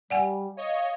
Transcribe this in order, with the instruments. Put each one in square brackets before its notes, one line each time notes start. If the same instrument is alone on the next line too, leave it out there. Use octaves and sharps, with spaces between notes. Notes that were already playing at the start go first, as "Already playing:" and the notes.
[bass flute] G3 [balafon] D5 F#5 G#5
[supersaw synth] C#5 D#5 [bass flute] F5